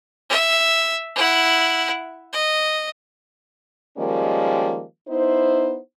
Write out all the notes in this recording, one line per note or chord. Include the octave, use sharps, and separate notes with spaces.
E5
E4 F#5
D#5
D#3 F3 G3 G#3 A#3 C#4
B3 D#4 E4 C5